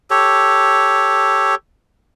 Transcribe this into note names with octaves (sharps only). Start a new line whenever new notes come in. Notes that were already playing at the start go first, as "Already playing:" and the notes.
G4 A4 C#5